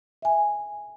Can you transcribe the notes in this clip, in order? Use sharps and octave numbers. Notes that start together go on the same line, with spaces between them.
E5 G#5